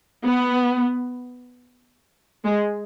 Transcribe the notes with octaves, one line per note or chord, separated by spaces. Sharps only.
B3
G#3